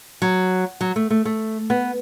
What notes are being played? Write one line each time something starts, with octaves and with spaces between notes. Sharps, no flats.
F#3
F#3
A3
A3
A3
B3